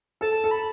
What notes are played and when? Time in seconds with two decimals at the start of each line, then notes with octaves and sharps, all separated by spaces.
0.21 A4 A5
0.44 A4
0.51 B5